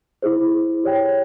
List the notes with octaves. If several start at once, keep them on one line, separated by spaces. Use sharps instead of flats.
E4 G#4 C5
G4 C#5 G5